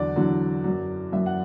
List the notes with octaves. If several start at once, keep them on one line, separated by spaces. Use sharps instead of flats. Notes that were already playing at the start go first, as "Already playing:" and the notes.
Already playing: E2 D3 F#3 D5
E2 D3 F#3
F#2 F#3
F#2 F#3 E5
F#5